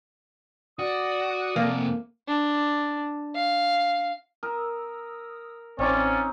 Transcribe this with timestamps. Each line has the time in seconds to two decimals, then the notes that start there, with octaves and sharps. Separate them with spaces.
0.79 F#4 D5 D#6
1.56 F2 C3 A#3
2.28 D4
3.35 F5
4.43 A#4 D#6 E6
5.79 A1 C4 C#4 D#4 F4 D5